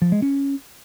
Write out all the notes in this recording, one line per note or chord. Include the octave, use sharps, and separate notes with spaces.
F3
G#3
C#4